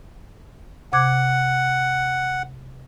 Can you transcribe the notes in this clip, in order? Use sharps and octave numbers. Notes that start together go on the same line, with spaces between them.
C3 F#5 D6 G#6